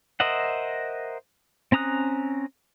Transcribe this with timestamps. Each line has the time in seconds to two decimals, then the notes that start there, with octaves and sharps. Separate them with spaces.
0.20 A#4 C5 D#5 E5 F#5
1.72 C4 C#4 A#5 D#6 F#6